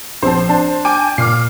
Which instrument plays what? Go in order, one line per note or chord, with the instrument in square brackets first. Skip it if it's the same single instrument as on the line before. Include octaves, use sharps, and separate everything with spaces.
[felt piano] A#1 C4 A5 [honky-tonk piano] C5
[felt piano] D4 A5
[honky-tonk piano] G5 G#5 D6
[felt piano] A#2 [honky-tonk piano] D6 F6 C7